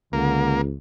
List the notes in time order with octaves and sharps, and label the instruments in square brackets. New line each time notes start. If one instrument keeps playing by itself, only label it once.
[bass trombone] C#2 [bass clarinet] D3 [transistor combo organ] A#3